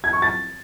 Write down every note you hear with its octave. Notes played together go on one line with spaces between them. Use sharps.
G#6
C#6
A6